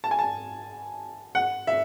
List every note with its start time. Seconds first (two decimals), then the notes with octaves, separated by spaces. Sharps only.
0.04 A5
0.11 G#5
0.19 A5
1.35 F#5
1.67 E5